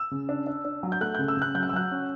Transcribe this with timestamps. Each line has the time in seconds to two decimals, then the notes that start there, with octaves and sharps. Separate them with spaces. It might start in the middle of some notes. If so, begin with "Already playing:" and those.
Already playing: E6
0.11 C#3
0.29 D4
0.47 D4
0.65 D4
0.83 F#3
0.92 G6
1.01 A3 F#6
1.15 C#3 G6
1.28 E6
1.37 C#3 F#6
1.55 F#3 G6
1.63 F#6
1.69 E6
1.73 F#3 F#6
1.91 C#4